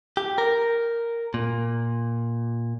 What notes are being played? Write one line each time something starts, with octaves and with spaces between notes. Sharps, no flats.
G4
A#4
A#2